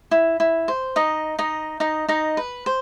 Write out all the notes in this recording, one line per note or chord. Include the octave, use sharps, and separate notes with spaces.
E4
E4
C5
D#4 D#5
D#4 D#5
D#4 D#5
D#4 D#5
B4
C5